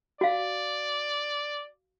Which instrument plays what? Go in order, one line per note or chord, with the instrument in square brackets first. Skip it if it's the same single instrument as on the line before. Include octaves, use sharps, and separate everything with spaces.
[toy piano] F#4 F5 [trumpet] D5